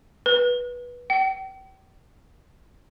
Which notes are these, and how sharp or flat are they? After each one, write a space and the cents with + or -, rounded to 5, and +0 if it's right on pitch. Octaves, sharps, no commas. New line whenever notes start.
B4 -15
G5 -35